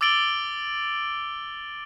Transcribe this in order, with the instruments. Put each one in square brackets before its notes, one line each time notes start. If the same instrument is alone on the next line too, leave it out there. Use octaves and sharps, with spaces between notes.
[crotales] D6 E6 A6 D7 F#7 G7